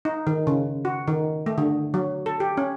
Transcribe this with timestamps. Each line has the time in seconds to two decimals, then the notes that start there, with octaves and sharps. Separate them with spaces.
0.05 D#4
0.27 D#3
0.47 C#3
0.85 F#4
1.08 D#3
1.46 A3
1.58 D3
1.94 F#3
2.26 A4
2.40 G4
2.57 C#4